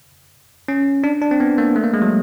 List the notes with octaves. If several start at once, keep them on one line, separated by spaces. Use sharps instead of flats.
C#4
D4
D4
C4
B3
A#3
A3
A#3
G#3
F#3